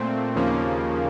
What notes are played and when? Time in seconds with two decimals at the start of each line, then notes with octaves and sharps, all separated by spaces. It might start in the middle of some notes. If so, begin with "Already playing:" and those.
Already playing: A#2 A3 C4
0.35 D#2 C#3 F3 A#3